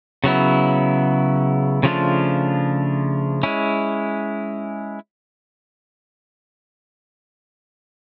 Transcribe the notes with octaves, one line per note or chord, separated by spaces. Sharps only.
C#3 F#3 B3 E4
C#3 F3 A3 D4 F4
G#3 C#4 E4